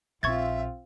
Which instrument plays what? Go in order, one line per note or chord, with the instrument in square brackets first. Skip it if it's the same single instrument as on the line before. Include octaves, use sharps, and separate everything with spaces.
[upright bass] A#1 [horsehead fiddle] C4 F4 [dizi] E5 [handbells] C#6 G#6 A6